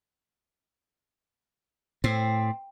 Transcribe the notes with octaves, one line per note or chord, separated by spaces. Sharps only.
A2 C4